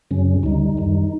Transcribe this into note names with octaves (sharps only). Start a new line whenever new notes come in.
F#2 C#3 F#3 C#4
D2 D3 G3 D#4
F#2 D#3 G3